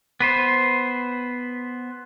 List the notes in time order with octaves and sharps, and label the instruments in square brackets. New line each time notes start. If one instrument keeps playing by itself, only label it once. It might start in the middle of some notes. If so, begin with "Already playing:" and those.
[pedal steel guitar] B3 B4 C5